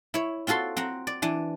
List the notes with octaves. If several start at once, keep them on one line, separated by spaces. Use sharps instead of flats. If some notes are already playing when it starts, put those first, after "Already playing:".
E4 C#5
C4 F4 F#4 A4 C6
C4 F#5 A#5
D5
E3 D4